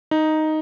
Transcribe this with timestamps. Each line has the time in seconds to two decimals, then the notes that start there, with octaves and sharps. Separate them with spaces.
0.11 D#4